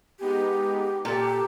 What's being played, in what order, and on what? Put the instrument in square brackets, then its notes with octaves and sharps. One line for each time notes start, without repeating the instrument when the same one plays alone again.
[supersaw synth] G#3 B3 D#4 [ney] G4
[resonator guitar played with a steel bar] A#2 [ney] G4 [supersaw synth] A4